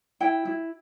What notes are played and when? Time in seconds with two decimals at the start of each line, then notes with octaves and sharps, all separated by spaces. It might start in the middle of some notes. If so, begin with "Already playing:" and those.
0.20 E4 G5
0.45 E4